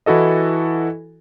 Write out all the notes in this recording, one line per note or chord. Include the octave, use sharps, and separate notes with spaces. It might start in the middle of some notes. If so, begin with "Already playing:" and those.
E3 E4 F#4 A4 D#5